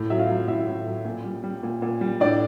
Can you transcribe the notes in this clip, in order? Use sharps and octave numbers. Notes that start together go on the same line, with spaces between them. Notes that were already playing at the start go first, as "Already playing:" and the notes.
Already playing: A2
F#3 E5
F4 F5
F#3
A2 E4 E5
A2
F#3
A#2
G3
G3
A#2
A#2
G3
A2 D4 D5